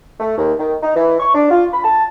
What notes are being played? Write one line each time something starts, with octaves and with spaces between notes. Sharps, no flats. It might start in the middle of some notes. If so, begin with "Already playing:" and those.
A3
D#2
D#3
D#4
E3
C#6
D4
F4
B5
A5